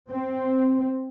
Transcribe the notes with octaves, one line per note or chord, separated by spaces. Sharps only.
C4